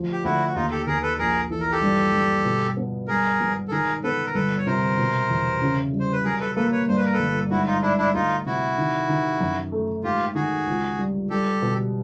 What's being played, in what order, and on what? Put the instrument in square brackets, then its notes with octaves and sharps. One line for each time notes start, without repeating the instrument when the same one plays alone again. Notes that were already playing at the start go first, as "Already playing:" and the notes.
Already playing: [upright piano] D2 F3
[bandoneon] G4
[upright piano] D2 [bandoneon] E4 F#4
[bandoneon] F#4
[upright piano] D#2 [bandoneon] D#4 F4
[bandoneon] G4 A4
[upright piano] D#2 [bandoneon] G#4 A#4
[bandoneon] A4 B4
[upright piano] A#1 [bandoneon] G#4 A#4
[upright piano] E3 [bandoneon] A4
[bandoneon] A#4
G4 A4
[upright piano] G2
G2
B2
B3
[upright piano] G2 [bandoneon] G#4 A#4
[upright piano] G#1
[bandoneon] A4
[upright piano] D#3 [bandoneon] G#4 A#4
[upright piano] B3 [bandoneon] A4 B4
[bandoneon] A#4
[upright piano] G1 [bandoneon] A4 B4
[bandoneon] C#5
[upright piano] C3 [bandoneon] A#4 C5
[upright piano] B2
E2
C#3
G3
[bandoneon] C5
B4
[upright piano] F#3 [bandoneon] G#4 A#4
[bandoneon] A4 B4
[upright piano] A#3 [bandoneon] A4 B4
[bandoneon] B4 C#5
[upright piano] G2 [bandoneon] C5
[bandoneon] B4
A#4
A4 B4
[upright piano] G1
[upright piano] G#2 [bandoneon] E4 F#4
[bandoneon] D#4 F4
[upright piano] G#2 [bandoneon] D4 E4
[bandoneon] D4 E4
[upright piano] D2 [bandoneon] D#4 F4
[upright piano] C3 [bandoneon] E4 F#4
[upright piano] D#3
D#3
F#2
A3
[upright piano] G#2 [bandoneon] F4 G4
[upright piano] D#3 [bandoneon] F#4 G#4
[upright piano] C#2
G3
[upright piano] G3 [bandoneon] G4 A4
[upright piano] B2